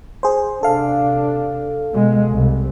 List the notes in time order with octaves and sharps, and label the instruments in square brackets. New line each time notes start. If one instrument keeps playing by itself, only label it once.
[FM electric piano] G#4 C5
[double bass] C3 D4 [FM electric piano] A4 F5
[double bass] B2 G#3
C2